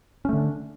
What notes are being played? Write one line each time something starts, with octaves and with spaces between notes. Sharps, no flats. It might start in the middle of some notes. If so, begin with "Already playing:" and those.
D3 A3 C#4 D4